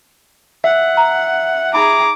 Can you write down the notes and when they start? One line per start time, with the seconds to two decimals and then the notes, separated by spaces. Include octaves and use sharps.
0.64 E5 F#5
0.97 A#5
1.74 D#4 G#4 A#5 B5 D6